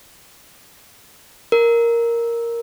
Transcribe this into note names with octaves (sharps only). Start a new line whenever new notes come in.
A#4